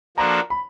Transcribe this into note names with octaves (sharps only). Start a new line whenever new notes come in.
F3 A#3 D4 F#4 A4 A#5
B5